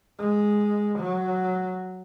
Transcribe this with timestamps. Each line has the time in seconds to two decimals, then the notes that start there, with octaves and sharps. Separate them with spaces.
0.19 G#3
0.99 F#3